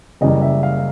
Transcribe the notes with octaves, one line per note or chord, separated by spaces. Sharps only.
F#1 F#2 C#3 E3 G3 D#5
E5
F5